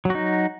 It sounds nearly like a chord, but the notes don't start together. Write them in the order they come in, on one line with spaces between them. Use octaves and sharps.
F#3 F#4 D#4